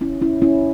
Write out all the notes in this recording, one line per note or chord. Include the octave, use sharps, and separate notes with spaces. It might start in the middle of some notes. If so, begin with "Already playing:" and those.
C#4 E4
C#4 E4
C#4 E4